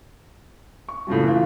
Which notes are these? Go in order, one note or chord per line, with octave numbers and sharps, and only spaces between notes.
C#6
A2 C#3 F3 F#3
E3 F4